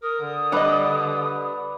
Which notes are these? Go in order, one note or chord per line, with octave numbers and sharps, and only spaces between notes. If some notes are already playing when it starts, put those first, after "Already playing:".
A#4 D#6
D3
G3 D4 B4 D#5